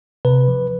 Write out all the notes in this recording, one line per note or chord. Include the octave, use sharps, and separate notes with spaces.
C3 B4
F3